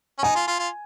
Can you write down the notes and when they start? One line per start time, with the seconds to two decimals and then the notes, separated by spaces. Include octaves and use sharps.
0.18 C#4
0.23 D#4 G#5
0.36 F4
0.47 F4
0.59 F4